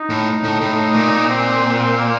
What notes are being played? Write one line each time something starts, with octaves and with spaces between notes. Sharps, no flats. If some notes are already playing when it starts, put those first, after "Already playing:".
Already playing: D#4
A2
A2
A2
A#2
C4
A#3